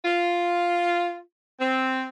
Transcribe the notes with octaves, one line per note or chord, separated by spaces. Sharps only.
F4
C4